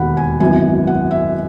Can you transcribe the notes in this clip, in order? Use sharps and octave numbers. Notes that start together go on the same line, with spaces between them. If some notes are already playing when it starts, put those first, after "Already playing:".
Already playing: E1 D#2 D#3 F#5 B5
G#5
G#1 F#2 E3 B3 G#5
F#5
E5